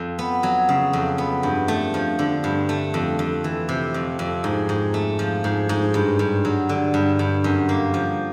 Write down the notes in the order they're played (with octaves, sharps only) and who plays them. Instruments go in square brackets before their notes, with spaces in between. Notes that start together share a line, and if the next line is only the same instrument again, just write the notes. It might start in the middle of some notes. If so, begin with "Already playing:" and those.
Already playing: [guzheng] F2
B3
F#3
C#3
F2
B3
G2
A3
F3
D3
G2
A3
F2
F2
E3
C3
F2
F2
G#2
G#2
A3
F3
G#2
G#2
G2
G2
F#3
D3
G2
G2
F#2
A#3
F3